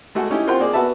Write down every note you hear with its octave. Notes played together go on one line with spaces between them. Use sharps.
G#3 A3 F#4
C#4 D#4 E4 G4
C4 F4 A#4 F#5 G5 C6
A#3 G#4 D5
B3 F#4 B4 E5 A5